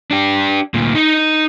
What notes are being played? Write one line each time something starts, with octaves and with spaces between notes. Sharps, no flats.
D4 G4
D2 A#2
D#4 D#5